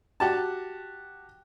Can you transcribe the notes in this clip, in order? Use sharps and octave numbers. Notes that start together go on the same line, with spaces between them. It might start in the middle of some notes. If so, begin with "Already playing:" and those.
F#4 G4 A5